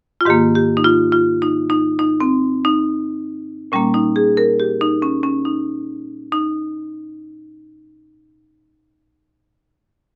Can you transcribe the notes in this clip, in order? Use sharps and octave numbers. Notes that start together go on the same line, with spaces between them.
F4
G#2 D#3 A#3 G4
G4
D#4
F4
F4
D#4
D#4
D#4
C4
D#4
A#2 G3 A#3 C#4
D#4
G#4
A#4
G4
D#4
C#4
C#4
D#4
D#4